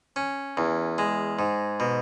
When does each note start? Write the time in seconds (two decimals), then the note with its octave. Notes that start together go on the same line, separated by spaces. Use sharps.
0.16 C#4
0.57 E2
0.98 G#3
1.39 G#2
1.80 B2